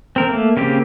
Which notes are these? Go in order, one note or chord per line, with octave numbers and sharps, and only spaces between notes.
C4 A#4
A3 A#3
C#3 A#3 C4 G4